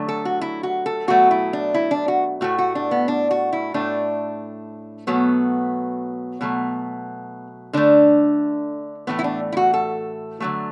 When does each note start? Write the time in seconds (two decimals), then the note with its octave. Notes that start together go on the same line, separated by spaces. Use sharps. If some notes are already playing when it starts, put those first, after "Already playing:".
Already playing: D3 F#3 A3
0.08 A4
0.25 F#4
0.41 E4
0.63 F#4
0.86 A4
1.08 B2 F#3 A3 F#4
1.31 E4
1.53 D4
1.74 E4
1.91 D4
2.08 F#4
2.41 A2 A3 F#4
2.58 F#4
2.75 D4
2.91 B3
3.08 D4
3.31 F#4
3.53 E4
3.74 A2 A3 D4
5.07 B2 F#3 A3 B3
6.41 B2 F#3 A3
7.73 D3 A3 D4
9.07 A2 E3 A3 B3
9.19 E4
9.24 D4
9.52 E4
9.57 F#4
9.74 A4
10.40 D3 F#3 A3